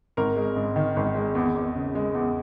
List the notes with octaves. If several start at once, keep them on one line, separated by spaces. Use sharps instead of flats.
G#1 A#4
G#3
G#2
D#3
G#1
G#3
E2
E2
C#3
G#3
E2